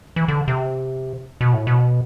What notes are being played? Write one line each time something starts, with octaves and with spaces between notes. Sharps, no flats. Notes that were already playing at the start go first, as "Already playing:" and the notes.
E3
D3
C3
B2
A2
B2